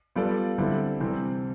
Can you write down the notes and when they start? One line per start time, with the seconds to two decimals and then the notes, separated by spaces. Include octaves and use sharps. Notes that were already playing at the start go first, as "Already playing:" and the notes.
0.16 G3 B3 F4 A4 D5
0.58 D3 G3 C4 E4 A4
1.00 C3 E3 G3 C4